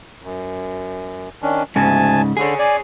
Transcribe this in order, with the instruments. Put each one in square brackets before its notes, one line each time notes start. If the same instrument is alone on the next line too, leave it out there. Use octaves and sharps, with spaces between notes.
[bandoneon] F#2
D#3 C#4 D4
[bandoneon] D2 G#5 A5 [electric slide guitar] G#2 C#3
[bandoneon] D3 [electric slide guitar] G#4 C#5
[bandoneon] D5 G#5